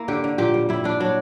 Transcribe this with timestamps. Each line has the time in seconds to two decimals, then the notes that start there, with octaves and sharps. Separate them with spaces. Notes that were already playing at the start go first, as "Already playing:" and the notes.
Already playing: A#3 E4
0.08 D3 G4
0.24 D3
0.38 A#2 G4
0.54 G3
0.69 G3 E4
0.84 G3 D4
1.00 F#3 D4